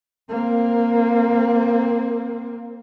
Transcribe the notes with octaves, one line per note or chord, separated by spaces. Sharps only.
A#3 C4